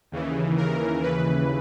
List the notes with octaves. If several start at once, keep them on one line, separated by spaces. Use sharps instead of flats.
D#2 C#3 E3
A#4
D#2 C#3 E3 B4